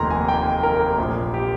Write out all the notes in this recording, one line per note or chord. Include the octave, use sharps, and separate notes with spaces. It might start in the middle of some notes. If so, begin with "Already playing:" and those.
Already playing: F1 D#2 D#3 A#5 C6
G#5
G5
A#4
A#1 A#2
G4